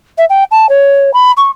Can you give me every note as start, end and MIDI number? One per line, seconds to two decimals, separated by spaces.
0.18 0.25 76
0.30 0.44 79
0.51 0.69 81
0.69 1.13 73
1.14 1.32 83
1.37 1.51 85